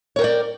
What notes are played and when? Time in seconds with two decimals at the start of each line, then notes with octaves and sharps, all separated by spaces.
0.16 C#5
0.19 A#4
0.21 G5
0.24 D5